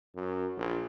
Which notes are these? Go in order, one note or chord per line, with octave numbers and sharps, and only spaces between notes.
F#2
A#1